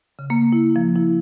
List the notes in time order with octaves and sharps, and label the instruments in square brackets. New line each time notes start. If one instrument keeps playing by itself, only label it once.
[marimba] C#3
A#3
E4
F3
E4